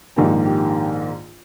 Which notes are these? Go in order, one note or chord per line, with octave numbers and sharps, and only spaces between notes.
A#1 G#2 D#3 A#3 D#4 G4
G4